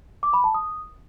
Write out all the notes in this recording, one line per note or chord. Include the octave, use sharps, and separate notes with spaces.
D6
B5
A5
D#6